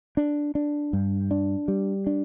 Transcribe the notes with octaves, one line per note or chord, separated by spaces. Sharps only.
D4
D4
G2
D4
G3
D4